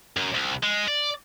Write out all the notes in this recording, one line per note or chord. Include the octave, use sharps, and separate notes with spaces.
F#2
C2
G#3
D5